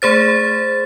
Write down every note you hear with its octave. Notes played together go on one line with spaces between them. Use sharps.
A3 G#4 C5 A6